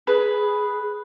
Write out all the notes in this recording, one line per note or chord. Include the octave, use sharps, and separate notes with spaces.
G#4 B4